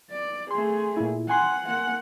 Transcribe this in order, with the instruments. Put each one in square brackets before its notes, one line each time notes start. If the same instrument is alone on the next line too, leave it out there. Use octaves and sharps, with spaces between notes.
[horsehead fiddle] D5
[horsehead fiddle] A3 G#4 [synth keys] C6
[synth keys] A#2 E4
[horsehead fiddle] F#5 [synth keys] G#5 C6
[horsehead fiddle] A#3 F#5